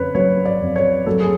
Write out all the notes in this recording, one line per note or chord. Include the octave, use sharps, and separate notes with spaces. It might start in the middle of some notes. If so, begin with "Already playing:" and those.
Already playing: F2 C#3 B4 C#5
F#3 C#5
D5
F2
C#5
F#3 A4
G#4